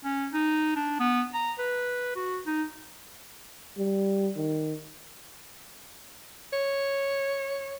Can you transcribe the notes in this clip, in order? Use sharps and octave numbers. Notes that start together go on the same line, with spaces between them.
C#4
D#4
D4
B3
A#5
B4
F#4
D#4
G3
D#3
C#5